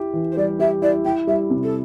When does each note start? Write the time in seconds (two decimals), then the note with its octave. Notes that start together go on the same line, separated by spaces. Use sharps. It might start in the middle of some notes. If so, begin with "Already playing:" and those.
Already playing: E4 G4
0.13 E3
0.31 C5
0.37 G3 D5
0.59 G4 E5
0.82 E4 D5
1.04 E4 G5
1.27 G3 E5
1.50 C3
1.63 A4